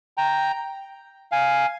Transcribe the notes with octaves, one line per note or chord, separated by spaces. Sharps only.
G5 A#5
F5 G#5